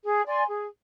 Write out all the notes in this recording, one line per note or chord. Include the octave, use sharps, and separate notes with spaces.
G#4
D5 G#5 C6
G#4